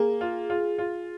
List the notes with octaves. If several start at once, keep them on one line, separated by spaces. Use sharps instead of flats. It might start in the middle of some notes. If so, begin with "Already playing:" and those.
Already playing: A#3 G#4
F4
F4
F4